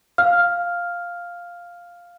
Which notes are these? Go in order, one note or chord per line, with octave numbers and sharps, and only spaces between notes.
F5 F6